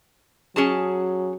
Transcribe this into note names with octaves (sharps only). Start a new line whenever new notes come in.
F#3 C#4 G#4 A5